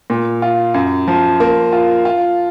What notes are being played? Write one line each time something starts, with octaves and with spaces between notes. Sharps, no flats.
A#2
F4
F#2
F3
A#3
F4
F4